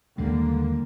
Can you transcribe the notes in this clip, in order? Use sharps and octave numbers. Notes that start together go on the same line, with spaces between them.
D#2 D3 G3 G#3 A#3